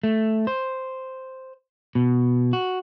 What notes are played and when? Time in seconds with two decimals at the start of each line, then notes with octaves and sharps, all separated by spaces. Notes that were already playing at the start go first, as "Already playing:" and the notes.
0.04 A3
0.47 C5
1.95 B2
2.53 F#4